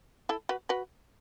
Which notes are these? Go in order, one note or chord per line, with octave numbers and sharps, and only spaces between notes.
E4 A4
F#4 B4
F#4 B4